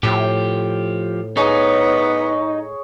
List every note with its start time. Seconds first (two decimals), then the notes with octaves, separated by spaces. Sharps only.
0.03 A2 F3 G4
1.37 B3 D#4 G#4 C#5